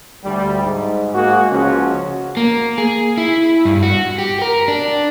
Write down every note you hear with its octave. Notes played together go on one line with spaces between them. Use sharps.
D2 G3
G#2
G#3 A#3 F#4
C#2 C#3 F3 C#4 F#4
A#3
G#4
E4
G2
F#4
G4
A#4
D4